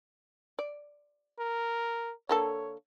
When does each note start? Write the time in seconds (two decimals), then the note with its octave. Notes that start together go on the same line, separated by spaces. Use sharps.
0.59 D5
1.39 A#4
2.29 D3 A#3 A4 C#5